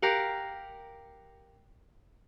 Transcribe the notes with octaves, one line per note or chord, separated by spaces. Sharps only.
G4 A#4 F5 F#5